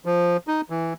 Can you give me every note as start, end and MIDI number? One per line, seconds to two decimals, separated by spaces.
0.05 0.37 53
0.48 0.61 63
0.70 0.93 52